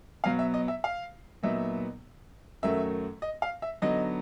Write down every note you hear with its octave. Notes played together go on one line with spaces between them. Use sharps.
B2 F#3 B3 F5
E5
D#5
E5
F5
A#2 F#3 B3 D#4 E5
F#2 D#3 F#3 A3 E5
D#5
F5
E5
D3 F#3 B3 D#4 D#5